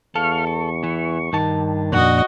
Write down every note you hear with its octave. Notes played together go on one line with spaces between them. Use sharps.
E2 A4 F5 C#6 F6
C#6
E3
G2 D#3 A5
F2 A#2 D4 F#4 D#5